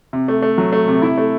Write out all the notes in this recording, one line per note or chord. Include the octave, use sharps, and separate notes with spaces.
C3
A3
A3
F#3
A3
C3
E4
A3